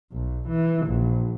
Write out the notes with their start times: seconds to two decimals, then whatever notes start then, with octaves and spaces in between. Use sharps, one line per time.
0.12 B1
0.48 E3
0.87 A#1